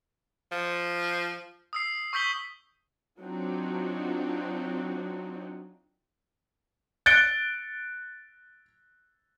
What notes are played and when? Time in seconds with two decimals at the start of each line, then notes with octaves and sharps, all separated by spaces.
0.52 F3
1.73 D#6 E6 C7
2.13 C#6 E6 G6 B6 F#7 G7
3.20 F#3 C4 D4 D#4 F4 F#4
7.06 F#6 A6 C#7 D7 G7